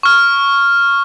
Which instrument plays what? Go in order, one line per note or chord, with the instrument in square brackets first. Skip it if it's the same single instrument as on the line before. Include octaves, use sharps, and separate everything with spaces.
[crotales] C#6 F6